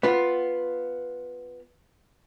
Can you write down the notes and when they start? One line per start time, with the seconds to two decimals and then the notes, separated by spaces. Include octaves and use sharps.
0.03 B3 F4